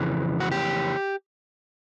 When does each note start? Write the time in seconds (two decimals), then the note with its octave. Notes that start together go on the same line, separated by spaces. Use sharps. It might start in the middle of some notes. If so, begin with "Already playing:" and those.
Already playing: F2 C#3 E3
0.40 F#4
0.51 G4